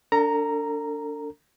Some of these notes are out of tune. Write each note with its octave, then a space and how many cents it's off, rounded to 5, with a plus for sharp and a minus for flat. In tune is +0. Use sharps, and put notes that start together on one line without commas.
D4 -20 A4 +45 A#5 +0